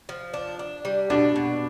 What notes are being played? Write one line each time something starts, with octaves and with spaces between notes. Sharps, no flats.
F3
D4
D4
G3
B2 D4
B2